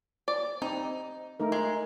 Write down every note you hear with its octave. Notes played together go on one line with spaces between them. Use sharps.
D5
C4 D#4
A3 D#4 A#4
G#3